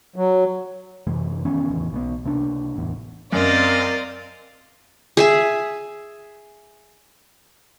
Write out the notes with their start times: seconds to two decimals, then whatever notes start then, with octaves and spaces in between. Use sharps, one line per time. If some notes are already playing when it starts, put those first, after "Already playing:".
0.16 F#3
1.07 F#2 C3 E3 G#3
1.45 D#3 E3 B3 C#4
1.70 D1 E2 C#3
1.92 B1 G3 B3
2.24 C#2 C3 B3 D4
2.76 D1 A1 E2
3.32 F#2 C4 A#4 D5 D#5 F5 A6
5.17 G#4 E5 G#5